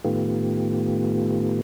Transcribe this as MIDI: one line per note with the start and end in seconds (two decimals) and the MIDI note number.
0.04 1.61 45
0.04 1.61 51
0.04 1.61 57
0.04 1.61 59
0.04 1.61 65
0.04 1.61 67